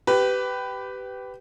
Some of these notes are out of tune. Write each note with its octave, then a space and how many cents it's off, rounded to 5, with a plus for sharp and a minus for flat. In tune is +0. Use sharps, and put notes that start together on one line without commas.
G4 -15 B4 +15